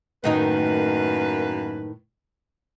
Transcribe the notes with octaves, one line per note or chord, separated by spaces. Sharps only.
F#2 A2 D#3 A#3 D#4 B4